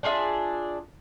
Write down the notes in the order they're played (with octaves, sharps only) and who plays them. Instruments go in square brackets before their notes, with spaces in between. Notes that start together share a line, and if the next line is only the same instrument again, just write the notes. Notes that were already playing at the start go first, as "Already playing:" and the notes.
[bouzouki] D4 F4 G#4 E5